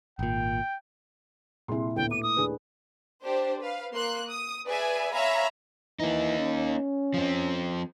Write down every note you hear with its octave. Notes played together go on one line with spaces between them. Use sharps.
G#1 A#2 G5
C2 A#2 E4 G#4 C6
D2 A2 A3 B3 E4 B4 G5
D6 D#7
D#6
D#2 D4 G#4 B4
D4 G4 C5
B4 F5
A#3 C6 F#6
D#6
G#4 B4 D5 E5 G#5
C#5 E5 F5 G#5 A#5 B5
E3 A#3 D#4
C#4
F3 C4